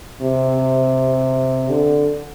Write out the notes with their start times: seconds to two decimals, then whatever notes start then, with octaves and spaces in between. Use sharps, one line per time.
0.21 C3
1.69 D3